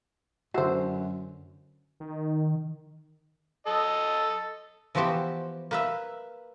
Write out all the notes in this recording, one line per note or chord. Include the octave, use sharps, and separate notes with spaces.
F#2 D3 E4 F#4 C5
D#3
A4 D#5
E3 F3 B3 F#4 G4 C5
A#3 B4 E5